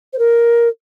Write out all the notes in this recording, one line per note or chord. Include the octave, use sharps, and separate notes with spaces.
C5
A#4